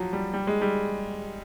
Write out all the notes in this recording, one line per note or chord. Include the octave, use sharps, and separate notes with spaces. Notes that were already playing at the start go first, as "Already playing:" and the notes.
Already playing: F3 F#3
G3
G3
G#3
G3